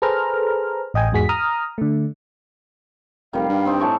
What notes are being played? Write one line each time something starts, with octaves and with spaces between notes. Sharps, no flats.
G#4 A4 B4 C5 A#5 F6
A1 D#5 G5 G#5
E2 G#2 F#4 G#4 B6
A#5 D#6 F6
D3 A3
F1 D#3 G3 F5
G2
C4 D#4 D6
A2 E3 A5 C#6